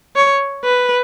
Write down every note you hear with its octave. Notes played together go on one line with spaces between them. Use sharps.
C#5
B4